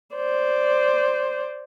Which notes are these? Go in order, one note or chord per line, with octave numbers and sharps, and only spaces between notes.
C5 D5